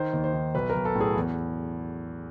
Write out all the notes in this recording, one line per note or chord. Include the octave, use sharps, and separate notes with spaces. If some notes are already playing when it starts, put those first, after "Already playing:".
Already playing: D#3 C5
D#2
C5
D#3
B1 B4
A#4
B1
A4
A2
G#4
E2